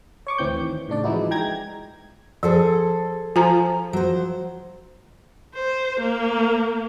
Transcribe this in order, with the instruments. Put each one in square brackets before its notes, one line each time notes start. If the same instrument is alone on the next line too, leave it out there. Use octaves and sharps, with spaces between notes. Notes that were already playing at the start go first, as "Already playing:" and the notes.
[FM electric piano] C#5 C#6 D6
D2 E3 C4 G6
D#3
A2 C#3 D4 D5
E3 F3 G#3 D#4 E4 F#4
G#3 G5 A#5 G#6 A#6
[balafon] F3 [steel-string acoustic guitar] G#4 A4 C5
[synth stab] F3 [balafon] G#5 A#5
[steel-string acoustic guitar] F#3 C5
[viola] C5
A#3